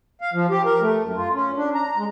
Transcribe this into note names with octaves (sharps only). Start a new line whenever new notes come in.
F5
F3
G4
A#4
A3
F#2
F4
C#4
D4
A#5
G#3